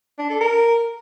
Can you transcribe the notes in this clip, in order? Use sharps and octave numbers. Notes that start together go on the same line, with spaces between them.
D4
A4
A#4